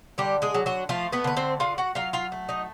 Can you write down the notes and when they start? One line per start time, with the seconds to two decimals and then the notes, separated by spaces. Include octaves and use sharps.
0.18 D3 G3 G4
0.42 G#3 G#4
0.54 F#3
0.66 F#3 F#4
0.89 F3 A3 F4
1.12 B3 B4
1.24 D3 B4
1.37 C4 C5
1.60 D3 F4 F5
1.78 F#4 F#5
1.95 F#3 F4 F5
2.13 F4 F5
2.32 A3
2.49 D#4 D#5